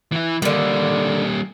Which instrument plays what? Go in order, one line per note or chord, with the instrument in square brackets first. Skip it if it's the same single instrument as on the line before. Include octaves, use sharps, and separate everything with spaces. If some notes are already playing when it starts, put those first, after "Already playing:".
[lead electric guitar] E3 E4
[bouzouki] D3 D#3 [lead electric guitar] G3 A#3